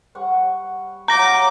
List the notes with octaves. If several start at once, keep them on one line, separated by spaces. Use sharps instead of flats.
G3 F#5 C#6
F#3 F4 E5 A#5 D6 A#6